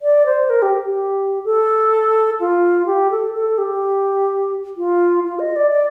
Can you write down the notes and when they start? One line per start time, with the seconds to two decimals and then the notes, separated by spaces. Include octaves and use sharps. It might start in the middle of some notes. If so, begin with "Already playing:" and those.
0.02 D5
0.26 C5
0.50 A#4
0.62 G4
0.86 G4
1.45 A4
2.40 F4
2.86 G4
3.11 A4
3.34 A4
3.58 G4
4.77 F4
5.25 F4
5.39 D#5
5.56 D5
5.71 D5